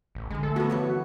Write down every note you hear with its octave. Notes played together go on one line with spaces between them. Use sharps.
A1
D3 F3 G#3
A3 A4
B3 F#4 A4
G2 E3 C#5
F#4